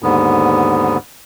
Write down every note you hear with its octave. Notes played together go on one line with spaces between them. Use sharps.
D#2 G#2 D3 B3